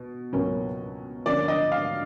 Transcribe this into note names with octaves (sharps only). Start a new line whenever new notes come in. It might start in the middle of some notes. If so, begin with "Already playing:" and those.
Already playing: B2
C#2 B2 F#3 A#3 C#4
G2 D3 F3 A#3 C#4 D5
D#5
F5